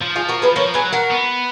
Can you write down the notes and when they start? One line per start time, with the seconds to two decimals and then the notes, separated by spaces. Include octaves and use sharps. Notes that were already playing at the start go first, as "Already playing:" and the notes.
0.02 F3
0.16 F4 G#4
0.28 F#4 A#4
0.42 G#4 B4
0.56 F3 A#4 C#5
0.74 F#3 G#4 B4
0.93 F#4 A#4
1.11 B3